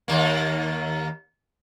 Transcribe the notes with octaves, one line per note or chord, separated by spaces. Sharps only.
D#2 A#3